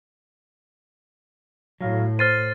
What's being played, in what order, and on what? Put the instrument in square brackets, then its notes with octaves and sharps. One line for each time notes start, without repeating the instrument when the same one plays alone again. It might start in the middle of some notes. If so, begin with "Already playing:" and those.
[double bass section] A2 [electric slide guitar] F#3 F5
[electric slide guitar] C5 [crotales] F6 A6 D#7